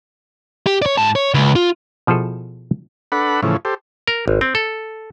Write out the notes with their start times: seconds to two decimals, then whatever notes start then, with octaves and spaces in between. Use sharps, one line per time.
0.67 G4
0.82 C#5 D5
0.98 G#2 A5
1.16 C#5
1.34 C#2
1.56 F4
2.07 B2 F3 E4 G#4 A4
3.12 D4 A4 B4 F#5 B5
3.43 A2 C#3 E3 F3
3.65 G4 A4 C5
4.07 A#4
4.28 G#1
4.41 C4
4.55 A4